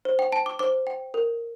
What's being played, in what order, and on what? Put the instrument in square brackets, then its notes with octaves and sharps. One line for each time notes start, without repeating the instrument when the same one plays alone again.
[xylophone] C5
G5
G5 A5
D6
C5 D6
G5
A#4